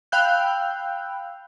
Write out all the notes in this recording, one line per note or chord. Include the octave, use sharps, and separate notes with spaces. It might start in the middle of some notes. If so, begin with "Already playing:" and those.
F5 G5 B5 E6 F#6 G6